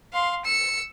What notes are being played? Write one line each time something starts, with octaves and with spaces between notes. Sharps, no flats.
F5 C6
E6 C#7